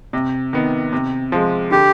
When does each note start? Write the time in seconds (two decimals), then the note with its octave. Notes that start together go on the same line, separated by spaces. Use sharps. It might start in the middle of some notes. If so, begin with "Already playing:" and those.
0.13 C3
0.53 D#3 B3
0.93 C3
1.32 F3 G#3
1.71 D3 G4